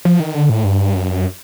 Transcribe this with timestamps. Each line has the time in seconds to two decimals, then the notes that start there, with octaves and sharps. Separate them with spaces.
0.05 F3
0.20 D#3
0.35 D3
0.50 A2
0.64 G2
0.95 F#2